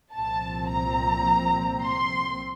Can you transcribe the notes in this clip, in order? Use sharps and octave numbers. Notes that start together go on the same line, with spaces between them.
C2 A#2 F3 C4 A5
A#5
C6